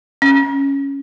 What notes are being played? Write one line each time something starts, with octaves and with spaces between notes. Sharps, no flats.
C#4